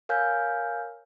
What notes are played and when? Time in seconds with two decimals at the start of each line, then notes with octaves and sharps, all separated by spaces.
0.09 A#4 C#5 F5 G#5 F6 G6